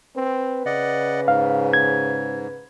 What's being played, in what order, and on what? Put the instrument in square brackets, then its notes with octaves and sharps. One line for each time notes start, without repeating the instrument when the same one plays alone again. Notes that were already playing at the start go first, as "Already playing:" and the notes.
[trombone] C4 [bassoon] B4
[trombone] C#3 [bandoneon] D5 D#5 F#5
[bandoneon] G#2 [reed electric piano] F5
[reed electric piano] G#6